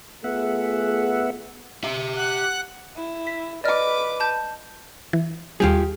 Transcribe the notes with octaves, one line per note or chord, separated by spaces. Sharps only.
A3 B3 F4 G#4 E5 F#5
G4 E5
F#5 F#6
E4
B6
B4 D5 D#5 D6 F6
A5 G6
E3
D#2 G3 F4 G4 G#4